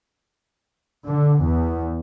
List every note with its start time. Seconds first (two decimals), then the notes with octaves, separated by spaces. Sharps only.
1.05 D3
1.44 E2